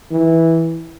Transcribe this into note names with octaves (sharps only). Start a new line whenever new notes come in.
E3